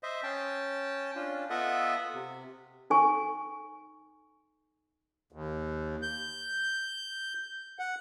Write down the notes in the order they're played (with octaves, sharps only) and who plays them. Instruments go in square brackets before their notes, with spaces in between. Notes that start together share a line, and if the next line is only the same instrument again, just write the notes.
[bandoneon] C5 D#5 E5
C#4 G5 A5
C#4 D4 F4
B3 F4 A4 D#5 E5 F#5
C3
[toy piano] D#4 A4 G#5 C#6
[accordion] D#2
G6
F#5